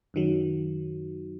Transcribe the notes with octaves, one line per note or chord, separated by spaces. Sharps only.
F#2 D#3 F#3